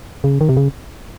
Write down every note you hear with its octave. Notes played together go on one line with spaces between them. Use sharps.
C#3
D#3
C3
C#3